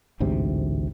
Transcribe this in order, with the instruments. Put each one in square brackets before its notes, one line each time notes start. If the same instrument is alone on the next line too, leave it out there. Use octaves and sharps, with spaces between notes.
[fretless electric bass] A1 D2 G#2 C3